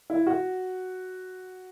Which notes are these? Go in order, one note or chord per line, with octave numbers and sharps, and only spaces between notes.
E4
F#4